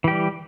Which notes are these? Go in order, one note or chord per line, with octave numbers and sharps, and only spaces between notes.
E3 G3 G4